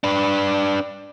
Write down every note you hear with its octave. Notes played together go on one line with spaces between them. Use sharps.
D4 B4